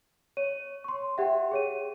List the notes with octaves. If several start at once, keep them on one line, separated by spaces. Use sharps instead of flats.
C#5 D#7
C6 C#6
G4 E5 F#5 G5
G#4 C#5 D#7